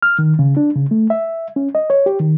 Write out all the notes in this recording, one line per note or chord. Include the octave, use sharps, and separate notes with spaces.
F6
D#3
C#3
D4
C#3
A3
E5
C#4
D#5
C#5
G4
D#3